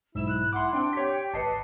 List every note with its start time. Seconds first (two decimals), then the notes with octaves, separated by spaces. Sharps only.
0.15 B1 G#2 E4 E6
0.28 F#6
0.53 F#5 C6 D6
0.73 C4 D4 G5
0.93 G4 C#5 B6
1.34 G#1 B4 D#5 A5 C7 C#7